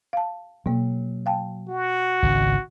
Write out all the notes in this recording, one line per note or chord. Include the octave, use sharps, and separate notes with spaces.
F5 A5
B2 F#3 A#3
F5 G5 A5
F#4
G#1 C#2